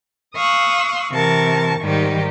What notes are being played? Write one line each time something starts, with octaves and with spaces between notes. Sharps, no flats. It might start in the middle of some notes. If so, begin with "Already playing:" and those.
F5 C#6 D#6 E6 F#6
C3 E3 A#4 A5 C#6
G#2 D#3 G3 D#4 G4